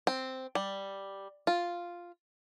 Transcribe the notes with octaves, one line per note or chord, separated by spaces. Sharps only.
C4
G3
F4